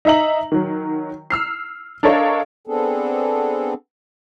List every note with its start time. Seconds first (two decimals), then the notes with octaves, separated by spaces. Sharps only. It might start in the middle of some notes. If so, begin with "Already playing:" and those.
0.05 D#4 D#5 E5 A#5 F#7
0.52 D#3 F#3
1.30 E6 F6 C7
2.03 D4 A4 A#4 C#5 D#5 F5
2.67 B3 C4 D4 G#4 A4